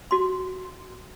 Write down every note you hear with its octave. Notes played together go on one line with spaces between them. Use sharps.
F#4 C6